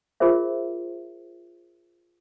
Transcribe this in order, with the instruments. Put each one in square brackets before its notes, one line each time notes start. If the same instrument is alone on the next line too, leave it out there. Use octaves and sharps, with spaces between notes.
[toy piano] F4 G#4 A#4 C5 E5